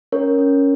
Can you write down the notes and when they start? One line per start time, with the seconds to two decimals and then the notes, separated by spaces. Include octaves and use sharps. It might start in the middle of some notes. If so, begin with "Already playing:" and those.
0.12 C#4 A#4 C#5
0.38 C#4